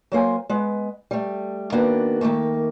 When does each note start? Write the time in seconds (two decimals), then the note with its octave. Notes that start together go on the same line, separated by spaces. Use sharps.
0.12 F#3 A#3 C5 G#5
0.49 G#3 B3
1.11 G3 A3
1.72 D#3 A#3 B3 D4 F#4
2.21 D#3 F3 A3 A#3